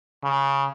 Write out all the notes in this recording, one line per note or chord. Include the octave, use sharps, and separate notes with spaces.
C#3